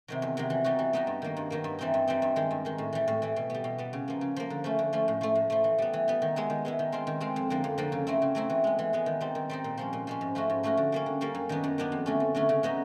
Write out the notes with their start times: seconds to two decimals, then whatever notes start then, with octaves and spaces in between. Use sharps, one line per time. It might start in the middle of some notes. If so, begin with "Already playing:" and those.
0.08 C3 D#3 F#3
0.22 E2
0.37 C3 D#3 F#3
0.50 E3
0.64 G3 B3 D#4 F#4
0.79 E3
0.93 G3 B3 D#4 F#4
1.07 G2
1.22 D#3 F#3 A#3
1.37 G2
1.50 D#3 F#3 A#3
1.64 G2
1.79 E3 G3 C4 D#4
1.94 G2
2.08 E3 G3 C4 D#4
2.22 G2
2.36 D#3 G#3
2.51 G2
2.65 D#3 G#3
2.78 A2
2.93 E3 G3
3.08 A2
3.22 E3 G3
3.36 B2
3.50 G3 B3
3.64 B2
3.78 G3 B3
3.93 C#3
4.08 F3 A#3
4.21 C#3
4.36 F3 A#3
4.50 D3
4.64 F3 A3 C#4
4.79 D3
4.93 F3 A3 C#4
5.08 A2
5.21 F3 A3
5.35 A2
5.50 F3 A3
5.64 E3
5.78 G3 B3
5.93 E3
6.08 G3 B3
6.22 D#3
6.36 G#3 B3 E4
6.50 D#3
6.65 G#3 B3 E4
6.79 D#3
6.92 G#3 C4 F4
7.07 D#3
7.20 G#3 C4 F4
7.36 F2
7.50 D3 F3 A#3
7.64 F2
7.78 D3 F3 A#3
7.92 C#3
8.07 F#3 A3 C4 E4
8.22 C#3
8.35 F#3 A3 C4 E4
8.50 E3
8.64 G#3 B3
8.79 E3
8.93 G#3 B3
9.06 D#3
9.21 G3 C4 D#4
9.35 D#3
9.49 G3 C4 D#4
9.64 A#2
9.78 F3 G#3 C#4
9.93 A#2
10.07 F3 G#3 C#4
10.21 G#2
10.35 F3 A3 C#4 F#4
10.50 G#2
10.63 F3 A3 C#4 F#4
10.77 D3
10.92 G3 A#3 C#4
11.06 D3
11.21 G3 A#3 C#4
11.35 F#2
11.49 D#3 F#3 B3 D4
11.63 F#2
11.78 D#3 F#3 B3 D4
11.92 F2
12.06 D3 F#3 A3 C#4
12.20 F2
12.35 D3 F#3 A3 C#4
12.49 C#3
12.63 F#3 B3 D#4 F#4